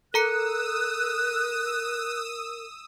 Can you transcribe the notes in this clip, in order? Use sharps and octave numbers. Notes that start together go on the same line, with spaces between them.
A4 A#4 A#5 D#6 E6 F#6 C#7